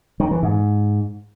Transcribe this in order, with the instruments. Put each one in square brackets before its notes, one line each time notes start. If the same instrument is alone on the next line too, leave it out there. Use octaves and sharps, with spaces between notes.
[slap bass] D#3
E3
G#2